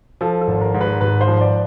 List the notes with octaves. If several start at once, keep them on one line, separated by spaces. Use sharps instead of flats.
F3 A4
A4
G#1
A#4
G#2
B4
G#1 B4
C5
F3
D5